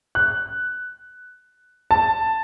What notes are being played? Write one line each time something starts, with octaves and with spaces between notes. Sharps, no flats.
F#6
A5